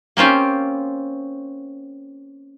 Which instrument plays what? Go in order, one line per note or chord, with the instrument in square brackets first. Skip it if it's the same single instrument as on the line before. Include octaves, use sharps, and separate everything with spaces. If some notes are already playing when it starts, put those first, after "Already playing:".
[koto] A#3 C4 C#4 F4 G4